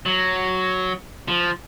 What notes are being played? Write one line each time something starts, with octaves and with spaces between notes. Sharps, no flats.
F#3
F3